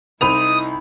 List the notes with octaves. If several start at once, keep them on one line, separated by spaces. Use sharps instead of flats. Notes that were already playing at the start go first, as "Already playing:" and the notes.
C2 D#4 E4 C5 B5 D#6 F7